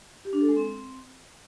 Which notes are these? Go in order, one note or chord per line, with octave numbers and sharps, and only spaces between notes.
G4
D4
A4
G#3
C4